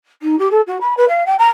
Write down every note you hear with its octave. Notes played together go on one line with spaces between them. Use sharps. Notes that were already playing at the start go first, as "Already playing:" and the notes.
D#4
G4
A4
F#4
B5
B4
F5
G5
A#5